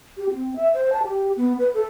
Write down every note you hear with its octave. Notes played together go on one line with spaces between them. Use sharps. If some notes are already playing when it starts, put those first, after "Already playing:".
G4
C4
E5
C5
A5
G4
B3
B4
A4